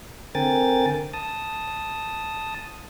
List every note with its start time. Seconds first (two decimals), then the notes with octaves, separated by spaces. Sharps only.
0.35 D3 C4 A#4 G5 G#5 A6
1.14 A5 D#6